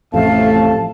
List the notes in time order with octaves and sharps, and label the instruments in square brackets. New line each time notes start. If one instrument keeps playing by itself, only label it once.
[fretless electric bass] A1 F2 [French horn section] A2 C3 A3 [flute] F5 [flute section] A5